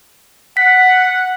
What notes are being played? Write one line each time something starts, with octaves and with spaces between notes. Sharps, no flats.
F#5 B6